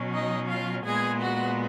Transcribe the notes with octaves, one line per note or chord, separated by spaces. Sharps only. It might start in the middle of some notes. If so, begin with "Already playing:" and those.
Already playing: B2 F#3 C#4
D#4 D#5
F4 F5
A#2 G#3 B3 G#4 G#5
F#4 F#5